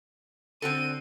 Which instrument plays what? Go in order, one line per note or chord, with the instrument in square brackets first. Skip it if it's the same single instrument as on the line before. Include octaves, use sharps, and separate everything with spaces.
[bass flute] D3 [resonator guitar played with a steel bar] C4 F#4 A4 [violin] D#7